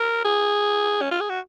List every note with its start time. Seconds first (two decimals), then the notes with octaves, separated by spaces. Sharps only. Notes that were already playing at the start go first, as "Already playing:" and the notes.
Already playing: A#4
0.25 G#4
1.01 C#4
1.11 F4
1.20 G#4
1.29 F#4